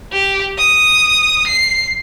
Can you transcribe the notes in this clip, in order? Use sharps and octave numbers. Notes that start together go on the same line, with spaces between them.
G4
D#6
C7